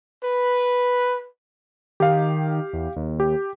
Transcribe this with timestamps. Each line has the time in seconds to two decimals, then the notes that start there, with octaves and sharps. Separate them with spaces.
0.23 B4
2.00 D#3 G4 F5
2.73 E2
2.96 D#2
3.20 G4